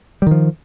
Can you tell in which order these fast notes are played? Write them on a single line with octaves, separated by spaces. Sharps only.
G3 D#3 F3